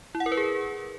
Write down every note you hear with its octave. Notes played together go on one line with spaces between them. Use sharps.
E4
F#5
A#4
B4
G#4